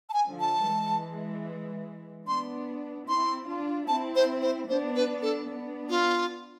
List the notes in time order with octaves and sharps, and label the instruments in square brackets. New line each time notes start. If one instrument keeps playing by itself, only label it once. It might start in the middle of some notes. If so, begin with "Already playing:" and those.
[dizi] A5
G#5
[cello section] D3 F3
[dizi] A5
[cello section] E3 G#3
[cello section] B3 D4 [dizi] C6
[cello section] C4 E4 [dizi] C6
[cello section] D4 F4
[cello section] C4 E4 [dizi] A5
[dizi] C5
C5
[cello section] B3 D4 [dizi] C5
[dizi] B4
A4
[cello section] B3 D4
[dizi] F4